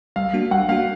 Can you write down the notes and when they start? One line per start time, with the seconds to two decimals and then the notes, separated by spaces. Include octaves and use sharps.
0.16 G3 F5
0.34 A#3 D4 F#4
0.51 G3 F#5
0.69 A#3 D4 F#4 F5